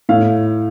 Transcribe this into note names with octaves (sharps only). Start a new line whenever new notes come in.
A2 F5